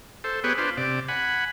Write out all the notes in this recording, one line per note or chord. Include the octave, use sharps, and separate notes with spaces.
A4 C5
B3 G4 G#4 B4 C#5
D4 F4 B4 C5
C3 D5
F#5 G#5 B5